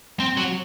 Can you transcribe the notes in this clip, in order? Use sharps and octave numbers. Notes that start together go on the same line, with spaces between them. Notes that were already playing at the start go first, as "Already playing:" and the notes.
C4
F#3